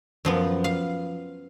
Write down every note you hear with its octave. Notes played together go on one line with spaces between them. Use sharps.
F#2 F3 B3
F5